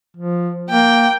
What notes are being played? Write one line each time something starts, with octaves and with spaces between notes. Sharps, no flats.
F3
A#3 G5